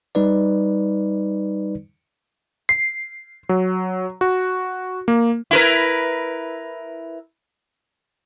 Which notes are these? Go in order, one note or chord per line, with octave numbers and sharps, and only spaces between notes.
G3 D#4 B4 D5
C7
F#3
F#4
A#3
E4 A#4 B4